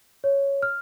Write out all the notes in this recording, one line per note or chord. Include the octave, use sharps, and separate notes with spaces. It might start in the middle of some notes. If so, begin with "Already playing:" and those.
C#5
F6